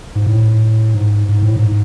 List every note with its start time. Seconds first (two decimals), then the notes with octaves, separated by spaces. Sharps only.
0.15 G#2
0.26 A2
0.95 G#2
1.29 G#2
1.42 A2
1.56 G#2